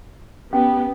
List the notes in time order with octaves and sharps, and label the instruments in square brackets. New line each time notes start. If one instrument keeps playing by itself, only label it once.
[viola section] B3 G4 [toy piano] C#4 G#5